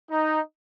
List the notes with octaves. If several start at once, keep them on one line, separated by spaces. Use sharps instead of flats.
D#4